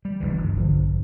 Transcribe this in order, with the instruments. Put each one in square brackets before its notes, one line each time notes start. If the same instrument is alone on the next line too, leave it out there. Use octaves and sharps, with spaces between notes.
[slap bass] G3
F#1 D2 E3
G1
[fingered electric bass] A#1 D3 F3